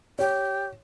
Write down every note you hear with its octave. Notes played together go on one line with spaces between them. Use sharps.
G4 C#5